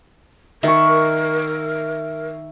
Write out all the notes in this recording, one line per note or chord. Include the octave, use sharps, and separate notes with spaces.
D#3 A#4 E5 C#6